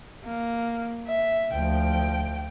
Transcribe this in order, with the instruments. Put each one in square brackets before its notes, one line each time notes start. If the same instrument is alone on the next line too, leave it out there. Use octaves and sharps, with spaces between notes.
[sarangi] A#3
E5
[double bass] D2 F3 [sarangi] G5